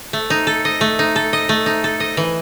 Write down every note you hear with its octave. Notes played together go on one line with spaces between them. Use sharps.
A3
D#4
A4
D#5
A3
D#4
A4
D#5
A3
D#4
A4
D#5
E3